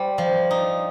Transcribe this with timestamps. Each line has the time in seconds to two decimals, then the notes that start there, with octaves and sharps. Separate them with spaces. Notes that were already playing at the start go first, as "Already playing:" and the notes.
Already playing: G3 C5
0.18 F3
0.51 D#4